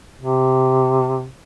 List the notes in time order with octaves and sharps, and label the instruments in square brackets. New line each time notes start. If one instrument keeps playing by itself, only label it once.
[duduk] C3